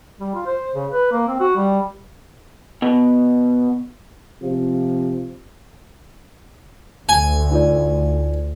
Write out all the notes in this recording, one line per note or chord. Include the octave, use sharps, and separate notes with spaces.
G3
F4
C5
C#3
B4
A#3
C4
F#4
G3
B2
C3 F3
D2 G#5
D#4 F4 D5